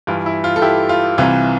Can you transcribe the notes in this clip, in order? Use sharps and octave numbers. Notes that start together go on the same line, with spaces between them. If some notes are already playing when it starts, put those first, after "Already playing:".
G2 E3 F4
E4
F4
A4
E4 G4
F4
C2 C3 E3 F4